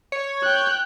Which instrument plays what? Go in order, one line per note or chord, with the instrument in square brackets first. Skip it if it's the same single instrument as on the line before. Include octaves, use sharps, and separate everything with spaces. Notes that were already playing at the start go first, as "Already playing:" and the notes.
[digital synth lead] C#5
[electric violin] G5 F#6